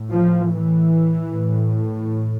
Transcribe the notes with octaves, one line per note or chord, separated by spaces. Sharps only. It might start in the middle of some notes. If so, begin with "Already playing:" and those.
Already playing: A2
F3
E3
A2